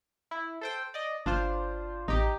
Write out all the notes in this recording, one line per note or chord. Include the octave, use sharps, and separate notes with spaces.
E4
A4 C5 G5
D5 D#5
G1 D4 F4 C5
A1 D#4 G4